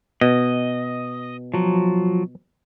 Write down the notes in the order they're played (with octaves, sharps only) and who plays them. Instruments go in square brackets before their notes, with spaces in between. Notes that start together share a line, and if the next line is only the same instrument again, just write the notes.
[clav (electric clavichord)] B2 [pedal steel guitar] D#5
[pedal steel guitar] F3 F#3